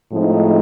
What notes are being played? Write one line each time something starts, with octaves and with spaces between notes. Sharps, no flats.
A2 F3 G#3 C4 D#4